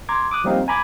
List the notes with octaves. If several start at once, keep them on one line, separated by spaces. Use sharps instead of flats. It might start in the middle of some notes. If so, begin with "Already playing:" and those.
A#5 C6 D6 G#6
D6 D#6 F#6
F3 G3 A#3 C4 D#4 F5
G#5 A#5 B5 D6 G#6